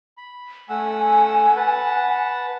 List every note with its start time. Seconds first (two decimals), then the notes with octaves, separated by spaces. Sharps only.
0.18 B5
0.69 A3 F#5 G#5 E6
1.56 B4 F#5 A5